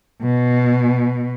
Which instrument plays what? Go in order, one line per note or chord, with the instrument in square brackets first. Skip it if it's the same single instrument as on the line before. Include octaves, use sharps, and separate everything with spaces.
[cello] B2